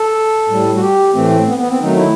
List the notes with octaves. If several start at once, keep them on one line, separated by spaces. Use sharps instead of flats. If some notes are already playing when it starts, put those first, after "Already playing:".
Already playing: A4
A2 G3
F#4
G4
A2 E3 A3 C4
B3
B3
C4
D#3 F#3 A3 D#4
E4